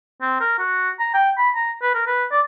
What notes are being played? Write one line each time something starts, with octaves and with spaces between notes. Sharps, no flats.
C4
A#4
F#4
A#5
G5
B5
A#5
B4
A#4
B4
D5